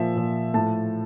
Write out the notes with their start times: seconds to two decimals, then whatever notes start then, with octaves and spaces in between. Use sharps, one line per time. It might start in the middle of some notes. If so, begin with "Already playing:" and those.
Already playing: A#2 F3 E5
0.15 A#2 F3
0.54 A2 F3 A5